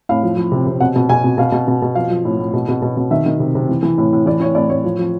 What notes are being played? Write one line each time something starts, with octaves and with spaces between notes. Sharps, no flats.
A2 F5
F3
F3
C3
C3
B2 F#5
B2
B2 G#5
B2
B2 F5
B2
B2
B2
F3 F5
F3
A2
A2
B2
B2
B2
B2
D#3 E5
D#3
C3
C3
E3
E3
A2
A2
E3 D5
E3 C#5
A2 D5
A2 C#5
F3
F3